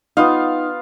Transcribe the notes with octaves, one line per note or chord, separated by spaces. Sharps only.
B3 D#4 F4 F5